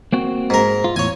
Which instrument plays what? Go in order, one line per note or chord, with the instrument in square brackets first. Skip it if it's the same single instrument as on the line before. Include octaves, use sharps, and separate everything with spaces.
[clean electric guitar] A#3 C4 F#4
[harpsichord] G#2 A#4
[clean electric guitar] F4
[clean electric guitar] E2 A2 F4 [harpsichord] C#5 G#5